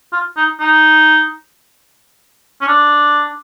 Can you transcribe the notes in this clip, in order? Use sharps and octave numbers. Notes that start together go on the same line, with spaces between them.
F4
D#4
D#4
C#4
D4